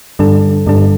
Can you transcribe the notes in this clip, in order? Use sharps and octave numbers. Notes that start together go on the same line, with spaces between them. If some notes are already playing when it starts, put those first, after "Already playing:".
G2 D3 G3 D4 A4
G2 D3 G3 D4 A4